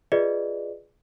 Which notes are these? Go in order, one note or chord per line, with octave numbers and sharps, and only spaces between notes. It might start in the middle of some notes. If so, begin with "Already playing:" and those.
F4 G#4 B4 D5 D#5